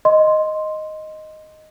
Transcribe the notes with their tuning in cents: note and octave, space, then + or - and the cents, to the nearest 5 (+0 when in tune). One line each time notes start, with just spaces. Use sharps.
D#5 +0 C6 +0